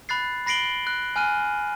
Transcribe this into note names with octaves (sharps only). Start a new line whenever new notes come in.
B5 F#6 A6 C7
B5 A#6 C7 D7 F#7 G7
F#6
G#5 F6 F#6 D#7